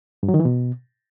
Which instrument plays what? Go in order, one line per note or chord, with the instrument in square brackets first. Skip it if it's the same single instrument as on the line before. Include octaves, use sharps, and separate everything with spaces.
[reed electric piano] G2
F#3
D#3
E3
B2